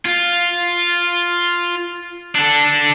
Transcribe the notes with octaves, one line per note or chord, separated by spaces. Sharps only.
F4
D4 A4